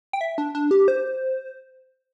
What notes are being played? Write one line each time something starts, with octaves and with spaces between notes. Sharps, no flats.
G5
E5
D4
D4
G4
C5